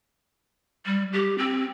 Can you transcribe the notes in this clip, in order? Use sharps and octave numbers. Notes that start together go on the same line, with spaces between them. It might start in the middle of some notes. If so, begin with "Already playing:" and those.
G3
G4
C4